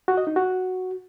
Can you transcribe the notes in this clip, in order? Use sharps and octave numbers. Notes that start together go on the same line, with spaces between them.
F#4
D#5
D#4
F#4